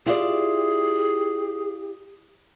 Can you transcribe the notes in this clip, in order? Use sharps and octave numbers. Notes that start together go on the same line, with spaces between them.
E4 F4 G4 G#4 D5